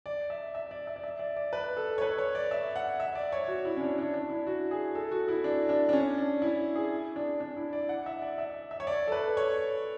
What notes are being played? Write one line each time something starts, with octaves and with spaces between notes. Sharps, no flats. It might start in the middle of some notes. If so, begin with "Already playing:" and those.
D5
E5
E5
D5
E5
D5
E5
D5
D5
B4
A4
C#5
B4
C#5
D5
E5
F#5
E5
D5
C#5
F#4
E4
C#4
D4
D4
D4
E4
F#4
G#4
A4
F#4
E4
D4
D4
D4
C#4
D4
E4
G#4
D4
D4
E4
D5
F#5
E5
D5
E5
E5
C#5
D5
A4
B4
C#5